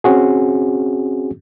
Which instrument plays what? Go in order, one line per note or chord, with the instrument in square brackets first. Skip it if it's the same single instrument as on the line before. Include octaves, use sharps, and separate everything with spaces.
[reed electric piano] C4 C#4 F#4 G#4